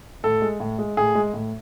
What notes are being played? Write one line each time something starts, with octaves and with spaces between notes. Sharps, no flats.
A2 A4
G#3
A2
G#3
A2 G#4
G#3
A2